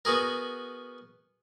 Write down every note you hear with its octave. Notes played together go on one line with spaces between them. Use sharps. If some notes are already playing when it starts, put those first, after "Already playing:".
B3 F#4 G#4 A#4